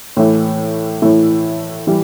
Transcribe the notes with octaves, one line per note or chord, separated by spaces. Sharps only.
A2 E3 A3 E4
A2 E3 A3 E4
E3 G3 E4